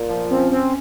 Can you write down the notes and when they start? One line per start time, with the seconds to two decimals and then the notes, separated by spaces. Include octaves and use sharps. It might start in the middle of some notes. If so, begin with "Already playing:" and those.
Already playing: A#2
0.09 F3
0.30 C4 C#4
0.51 C4 C#4